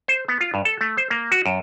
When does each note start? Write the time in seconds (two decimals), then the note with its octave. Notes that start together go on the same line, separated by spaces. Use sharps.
0.08 C5
0.28 B3
0.41 F4
0.54 G2
0.65 A4
0.81 A3
0.97 C5
1.11 A#3
1.31 F#4
1.46 F#2